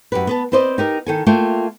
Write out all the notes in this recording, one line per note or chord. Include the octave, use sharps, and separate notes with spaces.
F#2 G4 B4
B3 B4 A5
C4 B4 C5 D5 D#5
D#4 G4 A#4
D#3 A4 G#5
A3 A#3 F4 E5 G5